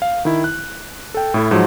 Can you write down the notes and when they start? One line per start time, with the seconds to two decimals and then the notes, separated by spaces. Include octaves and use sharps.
0.02 F5
0.25 D#3 E4
0.44 F#6
1.14 A4 G5
1.34 A2 E4 A4
1.51 G#2 F3 F#3